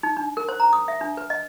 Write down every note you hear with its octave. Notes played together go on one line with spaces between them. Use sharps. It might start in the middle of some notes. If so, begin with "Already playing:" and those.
D#4
D4
A#4
C5
A#5
D#6
E5
D4
B4
D#5